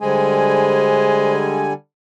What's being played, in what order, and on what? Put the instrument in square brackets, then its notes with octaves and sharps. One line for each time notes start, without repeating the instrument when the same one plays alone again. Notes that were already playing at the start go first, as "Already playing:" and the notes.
[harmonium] D3 G3 G#5 [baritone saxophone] G#3 [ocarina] C5